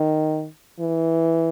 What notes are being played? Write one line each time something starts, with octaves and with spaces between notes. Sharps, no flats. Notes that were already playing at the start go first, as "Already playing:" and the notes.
Already playing: D#3
E3